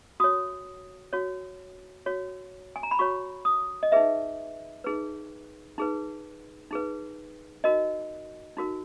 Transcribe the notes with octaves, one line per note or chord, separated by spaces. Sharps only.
F#4 C#5 D#6
F#4 C#5
F#4 C#5
G#5
A#5
B5
F#4 C#5 C#6
D#6
D#5
D#4 G#4 B4 E5
D#4 G#4 B4
D#4 G#4 B4
D#4 G#4 B4
D#4 F#4 A#4 D#5
D#4 F#4 A#4